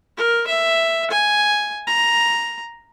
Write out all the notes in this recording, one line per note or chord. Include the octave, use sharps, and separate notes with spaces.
A#4
E5
G#5
A#5